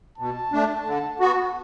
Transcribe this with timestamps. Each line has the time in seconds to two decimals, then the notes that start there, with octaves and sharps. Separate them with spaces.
0.18 B2 A5
0.52 A3 D4
0.87 D3
1.20 B3 F#4